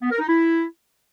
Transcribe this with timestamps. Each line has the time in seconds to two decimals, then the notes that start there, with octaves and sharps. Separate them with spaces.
0.02 B3
0.10 A#4
0.19 D#4
0.28 E4